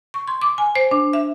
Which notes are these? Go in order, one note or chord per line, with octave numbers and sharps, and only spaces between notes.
C#6
C6
D6
G#5
C5
D4
E5